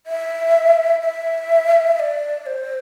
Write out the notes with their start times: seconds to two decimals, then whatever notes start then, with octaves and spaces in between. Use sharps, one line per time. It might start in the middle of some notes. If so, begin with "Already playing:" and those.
0.07 E5
1.01 E5
1.95 E5
2.00 D5
2.42 D5
2.46 C5